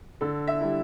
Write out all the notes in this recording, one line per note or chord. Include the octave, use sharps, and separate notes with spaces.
D3 A4
E5
G3 E4